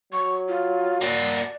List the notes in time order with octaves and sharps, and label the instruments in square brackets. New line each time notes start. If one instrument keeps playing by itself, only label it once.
[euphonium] F#3 [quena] C#6
[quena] F4
[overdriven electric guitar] A#3 F#4 [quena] D5